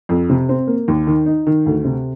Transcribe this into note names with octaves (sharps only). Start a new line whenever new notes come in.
F2
C3
C4
A#3
D#2
D#3
D#4
D#3
D2
C3